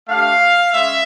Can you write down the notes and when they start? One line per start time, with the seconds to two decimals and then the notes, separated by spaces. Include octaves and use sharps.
0.08 A3 D4 G4 F5
0.73 G#3 C#4 E5